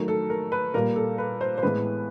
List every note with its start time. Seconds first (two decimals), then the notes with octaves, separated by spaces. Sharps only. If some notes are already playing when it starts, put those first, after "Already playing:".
Already playing: D#3 F#3 A3 A#4
0.08 A4
0.30 A#4
0.52 B4
0.74 A#2 G3 A#3 A#4
0.96 A4
1.18 B4
1.41 C5
1.58 C5
1.63 A2 E3 G#3 B3 B4